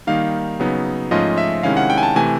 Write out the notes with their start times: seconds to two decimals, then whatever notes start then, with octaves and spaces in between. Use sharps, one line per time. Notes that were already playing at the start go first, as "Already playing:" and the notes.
0.07 D#3 G3 A#3 D#4 F5
0.60 C#3 F#3 B3 D#4
1.11 G#2 F3 A3 C#4 F4 D#5
1.38 E5
1.63 C3 D#3 G#3 C#4 E4 F5
1.77 F#5
1.90 G5
1.98 G#5
2.03 A5
2.15 C3 E3 A3 G#5